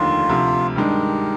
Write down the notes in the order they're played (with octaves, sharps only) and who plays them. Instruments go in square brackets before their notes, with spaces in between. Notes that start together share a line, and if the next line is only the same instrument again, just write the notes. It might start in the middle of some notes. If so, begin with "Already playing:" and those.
Already playing: [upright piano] F1 D#2 D3 [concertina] F4
[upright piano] D2 C3 F3
[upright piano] G2 D#3 G#3 D4 [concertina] G4 A#4